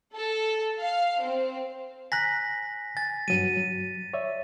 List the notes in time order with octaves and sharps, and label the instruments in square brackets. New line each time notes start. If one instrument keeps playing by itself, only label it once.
[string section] A4
F5
C4
[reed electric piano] G#5 A#5 F#6 [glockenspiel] A#6 B6
[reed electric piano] G#5 [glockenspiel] A6
[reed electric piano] G2 F#3 G3 [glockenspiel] D#7
[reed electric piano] F#3
C#5 D5 E5